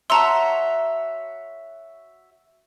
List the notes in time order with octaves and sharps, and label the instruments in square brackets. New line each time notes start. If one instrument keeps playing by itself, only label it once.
[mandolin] F#4 C#5 E5 [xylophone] A5 A#5 C6